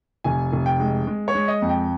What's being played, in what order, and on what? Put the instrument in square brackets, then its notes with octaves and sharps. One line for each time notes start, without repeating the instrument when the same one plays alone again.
[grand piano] F1 G#5
F1
G5
G#3
G#3
C#5
G#3
D#5
F2
G5